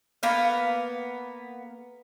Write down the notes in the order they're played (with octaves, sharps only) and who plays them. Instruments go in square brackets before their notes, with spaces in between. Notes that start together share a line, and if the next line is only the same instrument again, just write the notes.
[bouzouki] A#3 B3 F5